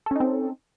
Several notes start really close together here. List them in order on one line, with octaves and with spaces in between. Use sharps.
A4 C#4 D#4 C4